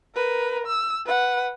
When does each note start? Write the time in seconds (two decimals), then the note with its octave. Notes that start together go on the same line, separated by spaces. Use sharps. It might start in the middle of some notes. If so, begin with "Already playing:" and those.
0.15 A#4 B4
0.67 E6
1.06 B4 F#5